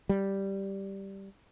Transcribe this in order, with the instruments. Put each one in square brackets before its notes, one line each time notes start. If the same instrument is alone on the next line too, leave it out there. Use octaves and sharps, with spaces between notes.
[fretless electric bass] G3